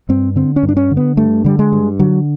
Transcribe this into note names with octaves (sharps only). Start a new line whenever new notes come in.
G2 C4
D3 C4
C#4
G2
D4
C#4
D3
B3
G2 A3
D3 G3
G#3
G2
D3 F#3